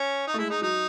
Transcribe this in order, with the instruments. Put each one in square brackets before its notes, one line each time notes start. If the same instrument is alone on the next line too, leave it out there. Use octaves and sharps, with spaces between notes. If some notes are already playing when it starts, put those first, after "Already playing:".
Already playing: [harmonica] C#4
D#4
[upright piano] A3
[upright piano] G#3 [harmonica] E4
[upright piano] G#3 [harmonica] D#4
[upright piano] F#3 [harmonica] D#4